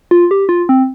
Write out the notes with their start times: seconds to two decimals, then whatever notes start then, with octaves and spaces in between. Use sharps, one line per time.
0.11 F4
0.31 G4
0.49 F4
0.69 C4